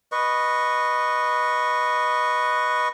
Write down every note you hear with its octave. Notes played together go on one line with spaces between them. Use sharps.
B4 D#5 C#6